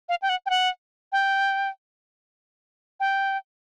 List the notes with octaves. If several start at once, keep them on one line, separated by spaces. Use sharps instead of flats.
F5
G5
F#5
G5
F#5
G5
G5